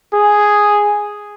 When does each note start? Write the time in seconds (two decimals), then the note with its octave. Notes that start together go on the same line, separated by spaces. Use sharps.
0.14 G#4